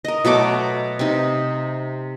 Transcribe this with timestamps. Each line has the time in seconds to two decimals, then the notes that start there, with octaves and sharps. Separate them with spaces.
0.05 A#4 D#5
0.25 B2 F#3 A3 D6
0.99 C3 D#4